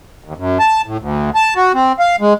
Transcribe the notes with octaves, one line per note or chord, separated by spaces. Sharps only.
D#2
F#2
A5
A2
D2
A5
F#4
C4
F5
G#3